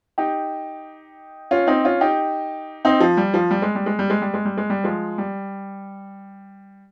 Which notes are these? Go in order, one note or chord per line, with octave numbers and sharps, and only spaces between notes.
D#4 G4
C#4 F4
C4 D#4
C#4 F4
D#4 G4
C4 D#4
F3
G3
F3
G3
G#3
G3
G#3
G3
G#3
G3
G#3
G3
G#3
G3
F3 G#3
G3